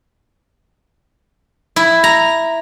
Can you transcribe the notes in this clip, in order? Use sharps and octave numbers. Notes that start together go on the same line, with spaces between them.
E4
A#5